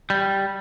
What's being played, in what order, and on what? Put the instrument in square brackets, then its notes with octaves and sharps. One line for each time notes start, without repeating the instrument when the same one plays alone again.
[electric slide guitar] G3